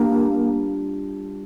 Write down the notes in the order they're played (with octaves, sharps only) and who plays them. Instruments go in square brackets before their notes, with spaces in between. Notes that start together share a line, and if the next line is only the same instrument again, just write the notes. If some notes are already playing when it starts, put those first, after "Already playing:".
Already playing: [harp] G3 D4 F4 [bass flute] A#3